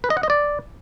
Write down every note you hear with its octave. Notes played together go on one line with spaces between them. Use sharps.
B4
D#5
F#5
D#5
D5